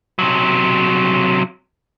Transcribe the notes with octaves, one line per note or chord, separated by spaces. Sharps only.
C3 F#3